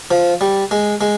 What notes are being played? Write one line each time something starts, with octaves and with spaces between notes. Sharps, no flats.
F3
G3
G#3
G#3